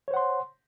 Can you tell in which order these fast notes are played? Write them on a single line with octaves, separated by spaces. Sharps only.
C#5 C5 F#5 C6